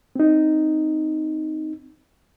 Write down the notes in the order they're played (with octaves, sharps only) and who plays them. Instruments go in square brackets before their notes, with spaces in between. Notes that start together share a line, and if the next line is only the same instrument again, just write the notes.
[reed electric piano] C4 D#4